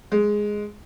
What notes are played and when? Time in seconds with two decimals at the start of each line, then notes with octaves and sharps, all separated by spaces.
0.12 G#3